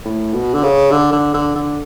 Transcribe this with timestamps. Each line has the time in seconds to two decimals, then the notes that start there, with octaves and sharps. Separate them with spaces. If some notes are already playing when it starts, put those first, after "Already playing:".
0.05 A2
0.34 B2
0.54 D3
0.63 C#3
0.92 D3
1.13 D3
1.34 D3
1.56 D3